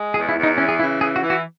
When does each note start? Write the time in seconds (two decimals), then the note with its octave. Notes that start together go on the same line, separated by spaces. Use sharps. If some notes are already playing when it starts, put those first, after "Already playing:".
Already playing: G#3
0.14 E2 G#4
0.29 E4
0.36 E2
0.43 D#4
0.58 E3 C#4
0.68 G#4
0.79 C#3 E4
1.01 E3 G#4
1.16 F#4
1.23 E3
1.30 F#4